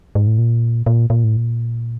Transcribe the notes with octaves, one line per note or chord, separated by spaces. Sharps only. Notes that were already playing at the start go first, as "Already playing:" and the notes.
G#2
A2
A#2
A#2
A#2
A2
A#2